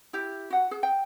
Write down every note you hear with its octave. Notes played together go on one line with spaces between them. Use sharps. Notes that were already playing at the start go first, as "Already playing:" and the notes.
E4 G4
F#4 F#5
G#4
G5